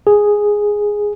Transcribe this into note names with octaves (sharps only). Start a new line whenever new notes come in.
G#4